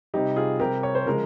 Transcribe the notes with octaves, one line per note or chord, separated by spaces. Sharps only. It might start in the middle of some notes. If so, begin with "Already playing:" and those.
C3 G3 D#4 G4
F4 G#4
C3 G3 G4 A#4
C#5
C5
C#3 F3 G#3 A#4